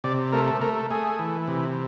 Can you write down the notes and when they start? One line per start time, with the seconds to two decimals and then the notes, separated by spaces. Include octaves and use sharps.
0.04 C3 D5
0.33 A3 A#4
0.61 A3 A#4
0.91 A3 G#4
1.19 E3
1.47 C3